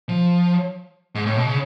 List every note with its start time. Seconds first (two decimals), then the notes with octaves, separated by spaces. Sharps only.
0.09 F3
1.15 G#2
1.26 A2
1.36 B2
1.46 C#3